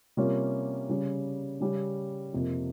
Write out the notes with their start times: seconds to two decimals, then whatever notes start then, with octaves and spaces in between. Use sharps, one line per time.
0.17 C3 G3 A#3 C#4 F4
0.89 C#3 G3 C#4
1.61 C#3 G3 C#4 G4
2.33 F2 C3 F3 A#3